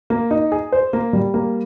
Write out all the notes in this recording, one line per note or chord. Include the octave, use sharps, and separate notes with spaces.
A#3
D#4
G#4
C5
A#3
G3
A#3